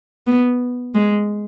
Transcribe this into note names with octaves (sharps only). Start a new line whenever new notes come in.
B3
G#3